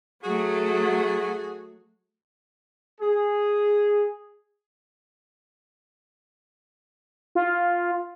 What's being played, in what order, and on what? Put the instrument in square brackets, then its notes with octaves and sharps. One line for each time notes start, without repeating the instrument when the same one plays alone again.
[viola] F#3 A3 [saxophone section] F#4 G#4
[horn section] G#4
[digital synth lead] F4